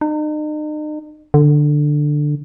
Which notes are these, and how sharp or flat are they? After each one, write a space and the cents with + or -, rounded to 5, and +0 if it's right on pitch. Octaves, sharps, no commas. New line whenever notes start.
D#4 -40
D3 +10